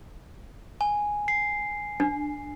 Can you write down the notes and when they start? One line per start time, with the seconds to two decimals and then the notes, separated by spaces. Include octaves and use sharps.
0.81 G#5
1.28 C7
2.00 D4